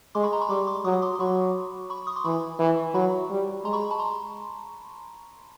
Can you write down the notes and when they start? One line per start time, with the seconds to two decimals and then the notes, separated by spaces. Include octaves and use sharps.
0.15 G#3 C6 D6
0.23 B5 C#6
0.33 A#5 C6
0.41 B5 C#6
0.49 G3 C6 D6
0.67 C6 D6
0.85 F#3 C#6 D#6
1.02 C6 D6
1.15 C6
1.20 F#3 B5 C#6
1.90 B5 C#6
2.07 C#6 D#6
2.16 C6 D6
2.25 E3 B5 C#6
2.59 E3
2.94 F#3 B5 C#6
3.30 G3
3.64 G#3 A#5 C6
3.73 B5 C#6
3.90 A5 B5
3.99 A#5 C6